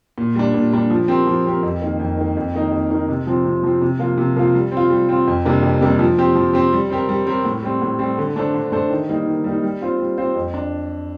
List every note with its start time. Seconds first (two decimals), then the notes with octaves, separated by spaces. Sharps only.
0.18 A#2
0.35 G3 D4
0.54 A#2
0.73 G3 D4
0.90 F3
1.08 C4 G4 A#4
1.27 F3
1.46 C4 G4 A#4
1.63 F2
1.82 D#3 A#3
1.99 F2
2.17 D#3 A#3
2.37 F2
2.54 D#3 A#3 D#4 A#4
2.72 F2
2.90 D#3 A#3 D#4 A#4
3.08 C3
3.27 F3 C4
3.45 C3
3.63 F3 C4
3.81 C3
3.99 F3 A#3 F4
4.18 C3
4.36 F3 A#3 F4
4.54 G3
4.72 C4
4.77 F4
4.90 G3
5.09 C4 F4
5.27 F2
5.45 C3 G3 A#3 D4
5.63 F2
5.81 C3 G3 A#3 D4
5.99 F3
6.18 C4 G4
6.35 F3
6.53 C4 G4
6.73 G3
6.90 C4 G4 A#4
7.09 G3
7.27 C4 G4 A#4
7.45 A2
7.63 G3 C4
7.82 A2
7.99 G3 C4
8.18 D3
8.36 A3 D4 A4 C5
8.54 D3
8.72 A3 D4 A4 C5
8.90 D#3
9.09 G3 A#3 D#4
9.26 D#3
9.44 G3 A#3 D#4
9.63 G3
9.81 C4 F4 C5
10.00 G3
10.18 C4 F4 C5
10.35 F2
10.54 D4